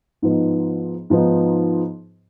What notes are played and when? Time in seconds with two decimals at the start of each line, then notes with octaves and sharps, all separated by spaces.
0.22 G#2 F3 B3 D#4
1.10 G#2 F3 B3 D#4